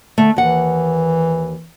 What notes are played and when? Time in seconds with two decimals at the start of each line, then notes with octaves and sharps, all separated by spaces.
0.18 D3 A3
0.36 D#2 E3 F#5